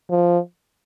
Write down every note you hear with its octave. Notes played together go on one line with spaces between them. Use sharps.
F3